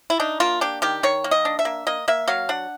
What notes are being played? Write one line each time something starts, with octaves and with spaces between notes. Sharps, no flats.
E4
D4 D#4
A#3 F4
D4 G4
D#3 G4
D#3 C#5
A#3
D#5
D4
E5
A#3
A#3 D#5
A#3 E5
F#3 F5
D4 F#5